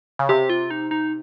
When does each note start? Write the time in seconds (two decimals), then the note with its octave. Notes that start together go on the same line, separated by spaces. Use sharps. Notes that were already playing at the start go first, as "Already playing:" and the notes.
0.19 C#3
0.29 C3 G4
0.50 F4
0.71 D#4
0.91 D#4